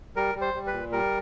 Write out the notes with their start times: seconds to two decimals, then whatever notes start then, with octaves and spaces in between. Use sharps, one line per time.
0.16 G3 A#4
0.35 G3
0.41 C5
0.54 G3
0.67 B4
0.73 A#2
0.92 G3 A#4